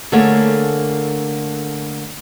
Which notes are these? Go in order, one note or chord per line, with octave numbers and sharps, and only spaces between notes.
D3 A3 A#3 G#4 C#5